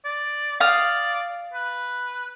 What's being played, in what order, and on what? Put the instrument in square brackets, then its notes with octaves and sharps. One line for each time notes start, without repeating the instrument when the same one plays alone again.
[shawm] D5
[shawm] D5 [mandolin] F5 D#6 F6
[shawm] B4